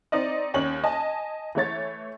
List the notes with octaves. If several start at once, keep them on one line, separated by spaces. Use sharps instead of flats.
C4 D#4 D5 D#5
D#2 C#4 F#7
D#5 G#5 A5
E3 A3 C#5 A6